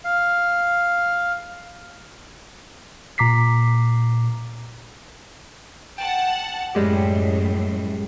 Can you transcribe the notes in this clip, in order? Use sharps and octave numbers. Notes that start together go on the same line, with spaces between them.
F5
A#2 A#5 D6 B6 C7
F#5 G5 A5
F#2 A2 G3 G#3 G4